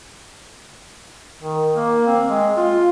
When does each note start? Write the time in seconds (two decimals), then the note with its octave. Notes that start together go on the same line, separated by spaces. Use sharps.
1.42 D#3
1.75 A#3
2.07 C4
2.29 G#3
2.57 F4